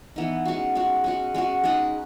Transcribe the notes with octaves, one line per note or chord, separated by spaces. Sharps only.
E3 B3 D#4
G#3 C#4 F#4
G#3 C#4 F#4
G#3 C#4 F#4
G#3 C#4 F#4
G#3 D#4 G#4 B4